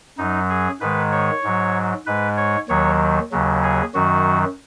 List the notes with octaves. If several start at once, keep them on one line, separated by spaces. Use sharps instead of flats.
F#2 F#3 D#4
G#4
G#2 D#3 G#3 B4
C#5
G#2 F#3
G#2 G#3 B4
C#5
D#2 D#3 F#3 C#5
D#2 C#3 F#3
G#4
F#2 D#3 F#3 F#4